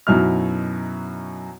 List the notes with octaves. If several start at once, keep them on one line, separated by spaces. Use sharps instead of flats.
F#2 B2 D#4 E4 F#4 F6